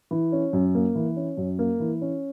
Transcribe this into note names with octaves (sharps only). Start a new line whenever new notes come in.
E3
C#4
F#2
A#3
E3
C#4
F#2
A#3
E3
C#4